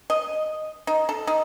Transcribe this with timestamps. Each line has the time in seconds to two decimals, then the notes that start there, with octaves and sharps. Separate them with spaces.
0.10 D#5
0.87 D#4
1.09 A4
1.27 D#4